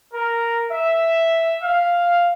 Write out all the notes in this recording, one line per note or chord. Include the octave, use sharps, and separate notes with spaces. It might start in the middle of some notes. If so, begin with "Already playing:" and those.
A#4
E5
F5